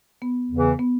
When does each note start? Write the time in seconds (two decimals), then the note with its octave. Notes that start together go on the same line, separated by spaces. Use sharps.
0.22 B3
0.51 E2 C#3 E3
0.79 B3